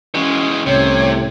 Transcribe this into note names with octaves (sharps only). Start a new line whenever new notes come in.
E3 G#3 C#4
C2 A2 C3 C#5